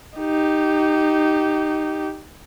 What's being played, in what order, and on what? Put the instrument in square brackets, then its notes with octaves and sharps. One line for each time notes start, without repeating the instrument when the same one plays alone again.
[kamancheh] D#4 G4